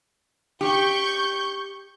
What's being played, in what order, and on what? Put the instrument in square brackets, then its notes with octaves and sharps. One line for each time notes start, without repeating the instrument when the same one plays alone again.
[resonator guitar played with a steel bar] G4 [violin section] C#6 G6